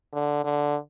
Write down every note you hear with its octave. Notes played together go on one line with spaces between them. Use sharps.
D3
D3